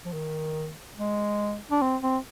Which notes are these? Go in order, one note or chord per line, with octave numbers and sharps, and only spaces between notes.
F3
D#3
G#3
D4
C4
C4